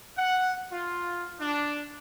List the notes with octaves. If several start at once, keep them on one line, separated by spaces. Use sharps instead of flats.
F#5
F4
D4